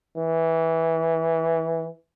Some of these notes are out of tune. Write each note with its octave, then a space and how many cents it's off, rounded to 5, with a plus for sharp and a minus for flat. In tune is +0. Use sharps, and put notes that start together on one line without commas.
E3 -10